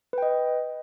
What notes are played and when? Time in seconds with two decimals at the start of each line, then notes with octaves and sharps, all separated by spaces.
0.13 B4
0.18 G5
0.22 D#5